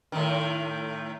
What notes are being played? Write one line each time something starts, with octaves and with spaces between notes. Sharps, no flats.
A2 D#3